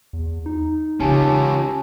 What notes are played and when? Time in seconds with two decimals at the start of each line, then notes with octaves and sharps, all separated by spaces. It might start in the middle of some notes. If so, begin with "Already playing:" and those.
0.13 E2
0.46 D#4
1.00 C#3 E3 C#4 F4 G4 G#5 A5